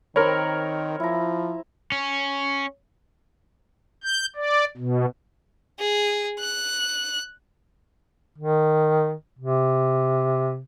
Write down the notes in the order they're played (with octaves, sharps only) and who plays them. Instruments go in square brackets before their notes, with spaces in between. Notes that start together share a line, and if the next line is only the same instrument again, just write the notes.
[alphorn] D#3 [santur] C4 B5 [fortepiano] A#4 C#5
[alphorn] F3 [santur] E4 A#5
[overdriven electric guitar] C#4
[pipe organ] G6
D5
B2
[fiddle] G#4
F#6
[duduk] D#3
C3